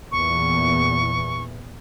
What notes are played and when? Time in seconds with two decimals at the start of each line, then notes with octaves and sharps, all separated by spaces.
0.12 E2 A#2 E3 C#6